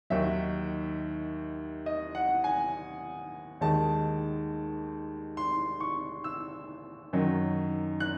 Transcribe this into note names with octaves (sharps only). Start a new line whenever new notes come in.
D#2 D#3 F#3 E5
D#5
F#5
G#5
D#2 D#3 G#3 A5
C6
C#6
E6
F#2 D#3 F#3
F#6